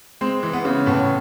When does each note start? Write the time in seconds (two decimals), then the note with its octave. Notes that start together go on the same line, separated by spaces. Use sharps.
0.21 G#3 C4
0.43 E3
0.53 B3
0.65 C#3
0.86 A2 B3